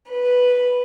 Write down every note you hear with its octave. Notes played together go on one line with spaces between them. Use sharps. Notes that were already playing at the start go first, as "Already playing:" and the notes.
B4